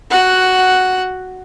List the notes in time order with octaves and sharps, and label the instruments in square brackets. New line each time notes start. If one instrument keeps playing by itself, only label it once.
[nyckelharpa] F#4 F#5